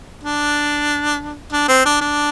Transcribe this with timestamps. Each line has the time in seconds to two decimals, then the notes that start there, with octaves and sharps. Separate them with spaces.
0.23 D4
1.53 D4
1.69 C4
1.86 D4
2.01 D4